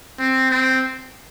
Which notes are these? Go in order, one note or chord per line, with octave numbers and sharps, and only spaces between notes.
C4
C4